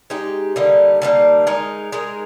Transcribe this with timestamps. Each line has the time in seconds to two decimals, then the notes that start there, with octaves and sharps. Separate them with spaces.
0.10 G#3 D#4 G4
0.56 D3 G3 A#3 D#4
1.02 D3 G3 A#3 D#4
1.47 G#3 D#4 A#4
1.92 G#3 D#4 A#4